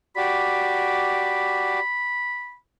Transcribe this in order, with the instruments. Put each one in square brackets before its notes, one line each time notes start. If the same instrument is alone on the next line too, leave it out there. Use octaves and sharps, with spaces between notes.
[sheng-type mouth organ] F#4 G4 D5 [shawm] B5